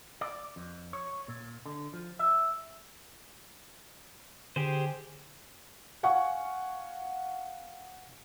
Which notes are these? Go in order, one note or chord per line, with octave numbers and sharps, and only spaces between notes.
D5
F2
C#5
A#2
D3
F3
E5
D3 G4 G#4 C5
F5 F#5 G#5 C#6